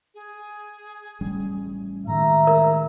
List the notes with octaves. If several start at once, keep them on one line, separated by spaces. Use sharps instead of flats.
G#4
A1 G3 C#4
A2 D#3 G#3 E5 A#5
A#4